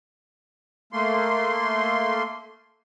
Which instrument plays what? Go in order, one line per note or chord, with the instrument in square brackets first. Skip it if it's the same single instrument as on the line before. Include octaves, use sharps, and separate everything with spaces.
[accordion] A3 A#3 C6